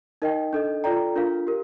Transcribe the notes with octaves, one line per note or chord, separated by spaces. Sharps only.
D#4 A#4 D#5 G5
D4 A4 D#5
F4 A4 D5 G5 A#5
D4 F4 A#4 F5
G4 A#4